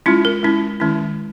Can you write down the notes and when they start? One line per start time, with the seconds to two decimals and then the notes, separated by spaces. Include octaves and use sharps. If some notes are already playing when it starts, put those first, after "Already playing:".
0.06 G#3 C#4 E4 F4
0.25 A#4
0.43 G#3 C#4 E4
0.80 D#3 G#3 C#4 E4